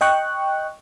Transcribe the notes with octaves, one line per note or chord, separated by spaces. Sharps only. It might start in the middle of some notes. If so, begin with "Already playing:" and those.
D#5 G5 C#6 F#6